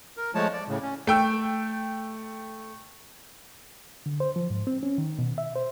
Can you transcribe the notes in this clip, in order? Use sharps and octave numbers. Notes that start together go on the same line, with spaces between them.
A#4
F3 G#3 A3 C#5 A5
D5
A2 C#3
C#4
A3 G5 E6
D3
C5
F3
G#2
C4
C#4
D#3
B2
E5
C5